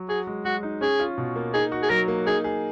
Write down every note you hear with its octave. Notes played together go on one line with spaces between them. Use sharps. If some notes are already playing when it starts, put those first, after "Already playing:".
Already playing: F#3
F#4 G#4
G#3
G#3 F#4
D#4
C#4 G#4
F4
B2
A#3
D#4 G#4
F#4
G#4
F#3 A#4
A#3
D#4 G#4
G#4